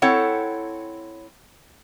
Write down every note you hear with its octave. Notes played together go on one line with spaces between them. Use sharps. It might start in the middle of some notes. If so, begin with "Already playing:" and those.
C4 E4 A4 C#5 F#5